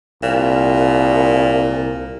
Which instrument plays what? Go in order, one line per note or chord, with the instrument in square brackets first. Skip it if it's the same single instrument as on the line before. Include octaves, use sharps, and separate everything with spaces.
[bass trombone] C2 [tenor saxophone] A#2